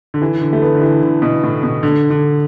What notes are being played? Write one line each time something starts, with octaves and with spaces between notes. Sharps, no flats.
D3
E3
D3
A3
B3
D3
E3
D3
B2
A2
B2
D3
D3